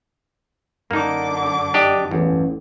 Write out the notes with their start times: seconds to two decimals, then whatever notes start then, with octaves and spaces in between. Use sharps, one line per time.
0.91 F#2 D3 A#3 D#4 D6
1.74 D4 G4 D#5
2.11 A1 E2